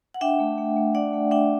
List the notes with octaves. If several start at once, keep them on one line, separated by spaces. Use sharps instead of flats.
F#5
D4 E5 G5
A3
A3
A3
D4 D5 F#5
A3
D4 E5 G5